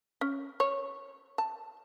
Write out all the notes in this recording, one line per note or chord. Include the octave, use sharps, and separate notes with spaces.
C#4
C#5
A5